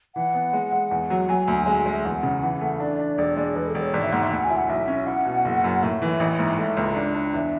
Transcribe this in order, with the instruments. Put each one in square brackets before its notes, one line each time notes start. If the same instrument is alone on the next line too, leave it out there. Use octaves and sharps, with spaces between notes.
[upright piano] E3 [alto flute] F#5
[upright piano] B3
G#3
G#3
E2
F#3
[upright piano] F#3 [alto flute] G#5
[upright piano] D2
[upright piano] G#3 [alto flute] G#5
[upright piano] G#3
[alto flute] E5
[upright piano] E2 [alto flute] F#5
[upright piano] C#3
E3
A3
[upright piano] D4 [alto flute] D5
[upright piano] D4
E1
G#3
[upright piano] E1 [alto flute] B4
[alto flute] A4
[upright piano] E1
[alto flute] C#5
[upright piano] G#1 [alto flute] D5
[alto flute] E5
[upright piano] G#2 [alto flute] F#5
[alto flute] E5
[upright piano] D2 [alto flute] F#5
[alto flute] G#5
[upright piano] E4
[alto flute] F#5
[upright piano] B1 [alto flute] E5
[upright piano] C#4
[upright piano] E4 [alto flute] F#5
[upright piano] B2
F#1
F#2
[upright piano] A2 [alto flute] E5
[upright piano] E3
A1
G#2
[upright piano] A3 [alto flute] E5
[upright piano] C#2
D4
D4
[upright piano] E2 [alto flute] E5